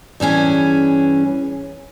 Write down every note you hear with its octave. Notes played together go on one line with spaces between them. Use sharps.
G2 E3 C#4 G#4